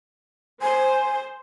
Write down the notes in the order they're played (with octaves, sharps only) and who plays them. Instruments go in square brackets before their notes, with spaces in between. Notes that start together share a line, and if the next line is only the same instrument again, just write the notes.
[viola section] C5 [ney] G#5